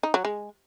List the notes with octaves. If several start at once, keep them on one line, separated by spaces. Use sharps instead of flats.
D#4
F#3
G#3